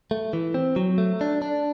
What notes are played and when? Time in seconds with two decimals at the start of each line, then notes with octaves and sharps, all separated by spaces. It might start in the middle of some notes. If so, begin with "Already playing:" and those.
0.11 A3
0.33 E3
0.54 C4
0.76 F#3
0.98 A3
1.21 D4
1.42 D4